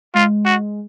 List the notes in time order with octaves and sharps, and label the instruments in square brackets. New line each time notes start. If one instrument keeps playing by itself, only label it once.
[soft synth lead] G#3 [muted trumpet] F4
[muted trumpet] F#4